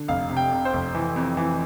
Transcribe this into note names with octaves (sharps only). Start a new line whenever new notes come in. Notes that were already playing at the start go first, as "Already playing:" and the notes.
Already playing: D3
F1 F5
C3
G5
C3
C5
F1
E3
F2
E3